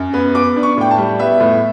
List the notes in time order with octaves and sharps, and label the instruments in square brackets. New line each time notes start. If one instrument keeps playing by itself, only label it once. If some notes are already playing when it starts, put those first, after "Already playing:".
Already playing: [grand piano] F#2
B3
B3 D6
D4
C#6
A2 G5
A5
G3
B3 E5
A2